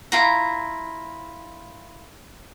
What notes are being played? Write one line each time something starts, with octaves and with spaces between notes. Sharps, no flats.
E4 F4 A#5